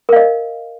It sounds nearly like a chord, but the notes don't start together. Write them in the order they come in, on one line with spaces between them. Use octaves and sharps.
A#4 F5 D#5